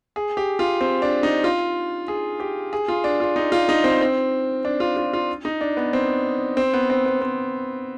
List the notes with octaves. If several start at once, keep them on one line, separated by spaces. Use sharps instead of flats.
G#4
G4
F4
C4
D4
D#4
F4
G#4
G4
G#4
F4
D4
F4
D#4
F4
D#4
C4
C4
D4
F4
F4
F4
D#4
D4
B3
C4
C4
B3
C4
B3
C4